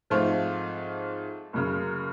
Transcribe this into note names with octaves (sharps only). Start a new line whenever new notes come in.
G#2 F3 A3 C4 F4
F#1 F#2 C#3